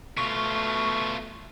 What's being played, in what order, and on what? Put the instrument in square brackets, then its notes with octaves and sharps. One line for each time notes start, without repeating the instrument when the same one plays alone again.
[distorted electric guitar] B2 F4 [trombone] A3 [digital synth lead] C#6